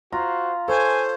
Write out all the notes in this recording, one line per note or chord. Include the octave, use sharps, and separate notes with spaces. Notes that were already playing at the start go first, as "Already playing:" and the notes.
F4 F#4 C5 A#5
A4 C5 C#5 G#5